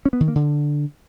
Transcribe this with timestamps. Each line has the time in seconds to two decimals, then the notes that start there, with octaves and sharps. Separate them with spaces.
0.06 C#4
0.13 B3
0.20 D#3
0.28 A#3
0.35 D3